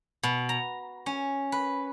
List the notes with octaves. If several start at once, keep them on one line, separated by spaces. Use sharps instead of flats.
B2
A#5
C#4
B4